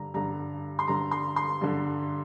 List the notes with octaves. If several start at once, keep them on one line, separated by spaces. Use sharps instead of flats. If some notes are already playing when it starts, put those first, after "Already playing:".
Already playing: G2 D3 A#5
G2 D3 A#5
C6
G2 D3 A#5
C6
C6
G2 D3